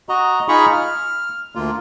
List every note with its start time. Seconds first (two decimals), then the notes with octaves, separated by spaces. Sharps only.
0.09 F#4 D#5 A#5
0.48 D#4 F4 G#4 A#5 B5 C#6
0.73 F6
1.55 D2 A#3 F4